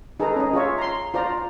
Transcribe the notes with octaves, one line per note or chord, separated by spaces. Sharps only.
D#4 G#4 A4 B4 A#5
C#4 D#5
F4 G#4 C#5 E5
A#5 C6
F4 C5 D5 A#5